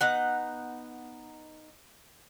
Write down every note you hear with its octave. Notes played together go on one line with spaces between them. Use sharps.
B3 D#4 F#5